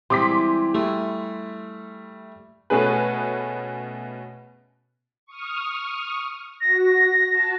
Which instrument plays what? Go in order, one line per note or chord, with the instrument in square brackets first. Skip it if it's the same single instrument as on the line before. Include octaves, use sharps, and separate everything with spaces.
[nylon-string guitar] E3 G3 G#3 [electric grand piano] C4 G4 [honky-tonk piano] C6 D6 B6
[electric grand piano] G3 E4 [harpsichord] A3 [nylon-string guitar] G4 G#4
[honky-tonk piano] B2 A3 C#4 G#4 B4
[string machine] C#6 D#6 F6
[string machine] F#4 [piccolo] A#6
[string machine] F#4 A5